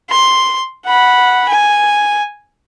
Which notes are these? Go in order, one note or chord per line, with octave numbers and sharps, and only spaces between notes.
C6
F#5 B5
G#5